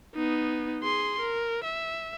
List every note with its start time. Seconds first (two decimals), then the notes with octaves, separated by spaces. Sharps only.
0.15 B3 D#4
0.82 G#4 C6
1.20 A#4
1.64 E5